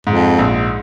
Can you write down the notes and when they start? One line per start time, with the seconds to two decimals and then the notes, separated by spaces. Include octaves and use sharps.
0.07 F2 G#2
0.39 A#1